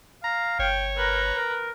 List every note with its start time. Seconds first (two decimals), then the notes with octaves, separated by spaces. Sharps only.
0.24 F5 A#5
0.59 G1 C#5 G5
0.97 A#4 B4 A#5
1.35 A#4